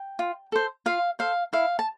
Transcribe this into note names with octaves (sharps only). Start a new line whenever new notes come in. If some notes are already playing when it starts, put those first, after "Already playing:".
Already playing: G5
F4
A4 C5
F4 F5
A4 C5 F5
E4 F5
A5